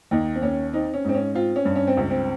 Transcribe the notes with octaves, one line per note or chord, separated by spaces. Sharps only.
D#2 D#4
C4
D#2 C#4
C4 D#4
C#4
G#2 C4
C#4
C4 F4
C#4
G2
C#4
C4
C#2
C4